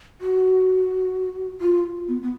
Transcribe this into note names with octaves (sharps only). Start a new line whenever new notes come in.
F#4
F4
B3
B3